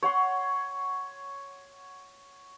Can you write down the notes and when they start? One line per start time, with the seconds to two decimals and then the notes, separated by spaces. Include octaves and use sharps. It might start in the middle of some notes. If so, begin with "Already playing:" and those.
0.03 C#5 F#5 C6